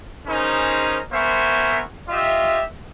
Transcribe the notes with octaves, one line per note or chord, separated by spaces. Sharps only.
C#4 D#4 G#4 A#4 C5
B3 A#4 C5 E5 G#5 C#6
F4 G4 D#5 E5